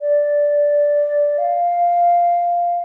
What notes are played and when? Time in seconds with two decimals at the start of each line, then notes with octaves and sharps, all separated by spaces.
0.01 D5
1.38 F5